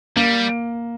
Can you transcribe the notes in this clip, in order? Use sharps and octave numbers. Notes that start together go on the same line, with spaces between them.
G3 A#3